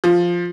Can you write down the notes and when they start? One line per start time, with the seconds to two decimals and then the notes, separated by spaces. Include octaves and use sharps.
0.04 F3